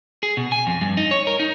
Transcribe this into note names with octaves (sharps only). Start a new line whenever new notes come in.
G#4
B2
G#5
F2
G2
D#4
C#5
A#4
D#4